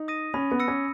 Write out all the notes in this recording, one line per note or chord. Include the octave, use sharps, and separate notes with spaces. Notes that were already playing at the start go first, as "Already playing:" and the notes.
Already playing: D#4
D#6 A#6 D#7
C#4 B5
B3
E6 A#6 C#7
C#4